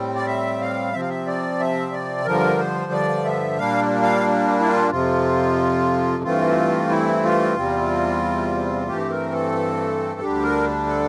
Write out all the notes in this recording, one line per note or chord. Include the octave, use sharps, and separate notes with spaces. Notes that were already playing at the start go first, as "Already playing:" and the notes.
Already playing: A2 G3 C4
D5
E5
F5
C3 F3 C4 E5
F5
E5
D5
E5
D5
G2 D3 F3 A#4
C5
D5
E5
A#2 G3 A#3 D4 F5
F5
E4
F4
F2 C3 F3 F4
G2 E3 A3 C4 F4
E4
F4
E2 C3 G3 C4
G2 E3 A3 C4 G4
A#4
A4
D2 D3 G3 D4 G4
A#4
A4